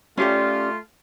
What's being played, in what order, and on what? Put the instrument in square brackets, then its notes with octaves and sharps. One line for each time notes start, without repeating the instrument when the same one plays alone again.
[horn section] A3 F4 [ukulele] C#4 G4 D5